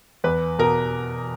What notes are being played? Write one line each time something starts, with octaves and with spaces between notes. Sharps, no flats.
E2 B4
B2 A#4